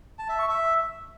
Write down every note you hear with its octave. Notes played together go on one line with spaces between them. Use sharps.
A5
E5
C#6
E5